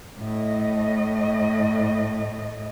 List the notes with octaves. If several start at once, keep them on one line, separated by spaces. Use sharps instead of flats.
A2 D#5